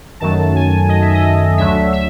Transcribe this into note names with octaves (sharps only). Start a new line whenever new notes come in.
F#2 D#3 F#3 A3 A5
G#5
D#5
E5
D#5
D2 D3 F#3 A3 E5
E5